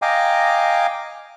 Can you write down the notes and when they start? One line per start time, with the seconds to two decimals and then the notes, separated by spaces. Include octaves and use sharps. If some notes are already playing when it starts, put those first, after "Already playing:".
0.02 D#5 F5 G5 G#5 A#5 D6